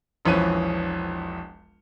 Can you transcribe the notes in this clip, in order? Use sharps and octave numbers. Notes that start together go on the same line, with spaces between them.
E1 A#1 E3 F3 C#4 D#7